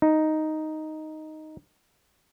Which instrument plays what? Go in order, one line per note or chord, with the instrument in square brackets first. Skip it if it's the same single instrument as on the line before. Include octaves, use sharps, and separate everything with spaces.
[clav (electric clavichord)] D#4